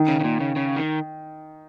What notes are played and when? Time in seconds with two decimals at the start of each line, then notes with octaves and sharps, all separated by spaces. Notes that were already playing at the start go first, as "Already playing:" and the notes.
Already playing: D#3
0.08 C#3
0.20 C#3
0.24 A#2
0.40 C#3
0.56 C#3
0.77 D#3